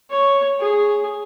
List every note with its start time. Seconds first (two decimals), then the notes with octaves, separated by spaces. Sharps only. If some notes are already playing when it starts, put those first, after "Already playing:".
0.10 C#5
0.60 G#4